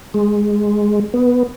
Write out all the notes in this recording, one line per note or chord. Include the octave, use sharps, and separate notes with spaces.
G#3
B3